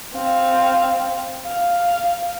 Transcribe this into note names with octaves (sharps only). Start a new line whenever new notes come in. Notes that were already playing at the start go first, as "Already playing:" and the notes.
C4 F5
F5